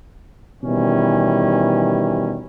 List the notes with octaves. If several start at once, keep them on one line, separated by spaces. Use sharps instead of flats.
B2 D#3 E3 G3 C#4